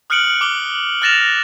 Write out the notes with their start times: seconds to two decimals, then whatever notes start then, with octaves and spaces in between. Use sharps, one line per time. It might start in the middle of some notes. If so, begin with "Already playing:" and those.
0.10 D#6 F6 F#6 C#7 D7 F#7
0.41 D6 F#7 G7
1.02 F6 F#6 A6 A#6 E7 F7